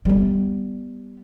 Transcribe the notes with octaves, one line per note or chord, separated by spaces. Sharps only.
G3 B3